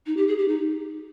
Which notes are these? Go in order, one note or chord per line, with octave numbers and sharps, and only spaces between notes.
D#4
G4
G#4
G4
D#4